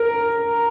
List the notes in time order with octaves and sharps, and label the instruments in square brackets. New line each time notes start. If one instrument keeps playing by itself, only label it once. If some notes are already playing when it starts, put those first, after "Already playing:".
Already playing: [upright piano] A#4